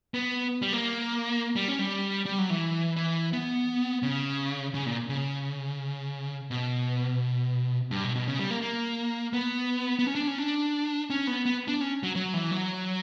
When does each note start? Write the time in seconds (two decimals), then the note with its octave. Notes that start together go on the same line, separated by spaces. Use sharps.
0.14 B3
0.62 G3
0.73 A#3
1.56 G3
1.68 C#4
1.79 G3
2.26 G3
2.39 F#3
2.50 E3
2.96 E3
3.33 B3
4.03 C#3
4.74 C#3
4.86 A#2
5.09 C#3
6.51 B2
7.91 G2
8.04 B2
8.16 B2
8.27 C#3
8.39 G3
8.51 A#3
8.62 A#3
9.33 B3
9.99 B3
10.07 C#4
10.15 D4
10.28 C#4
10.38 D4
11.10 C#4
11.27 B3
11.46 B3
11.68 D4
11.81 C#4
12.03 F#3
12.15 F#3
12.34 E3
12.51 F#3